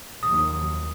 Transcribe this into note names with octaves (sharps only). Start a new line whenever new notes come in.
D#2 F3 F#3 D#6